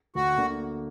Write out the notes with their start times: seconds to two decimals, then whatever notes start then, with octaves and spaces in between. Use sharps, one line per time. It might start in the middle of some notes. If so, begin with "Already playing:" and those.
0.15 D2 F#4
0.37 D3 A#3 D4